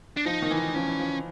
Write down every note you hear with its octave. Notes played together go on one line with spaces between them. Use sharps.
D4
F3 D#4
D#3
E3
F3 C#4
E3
F3